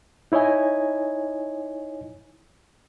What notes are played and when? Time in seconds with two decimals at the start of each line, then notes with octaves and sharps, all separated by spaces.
0.32 D#4 E4 C#5 D#5 G#5